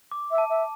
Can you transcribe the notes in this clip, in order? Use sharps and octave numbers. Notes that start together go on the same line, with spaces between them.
D6
E5
A5
E5